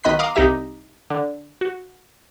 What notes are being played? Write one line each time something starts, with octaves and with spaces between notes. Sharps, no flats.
B1 D#3 D#5 B5 F#6 B6
F5 A#5 C6 D6 D#6
C2 D#4 G4 E5 A#6
D3
F#4